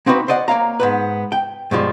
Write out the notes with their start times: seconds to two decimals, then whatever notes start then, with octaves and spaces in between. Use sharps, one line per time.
0.06 A#3 C4 D#4 F#4 B4
0.28 C5 D5 D#5 F#5
0.48 A#3 C#5 F5 A#5
0.80 G#2 B3 B4
1.32 G5
1.71 G2 B2 F3 G#3